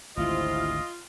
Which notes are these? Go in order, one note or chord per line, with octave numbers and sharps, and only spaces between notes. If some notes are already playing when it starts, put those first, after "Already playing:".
G#1 D2 G#2 C3 F3 E4 F4 D#5